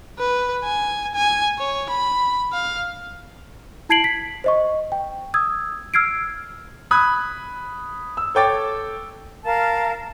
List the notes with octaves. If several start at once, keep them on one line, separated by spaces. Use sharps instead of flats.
B4
G#5
G#5
C#5
B5
F5
E4 A5 G#6 C7 D7 F#7
B6
C5 D#5 C#6
G5
D#6 E6 G#6
E6 F6 G#6 C7 D7
B5 D#6 F#6 G#6
E6
A4 C#5 G5 D6 A6
A#4 F5 A5